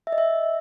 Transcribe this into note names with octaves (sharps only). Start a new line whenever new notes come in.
E5
D#5
E5